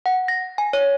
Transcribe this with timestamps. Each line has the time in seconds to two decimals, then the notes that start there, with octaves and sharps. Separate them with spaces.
0.06 F#5
0.28 A#6
0.58 G#5
0.73 C#5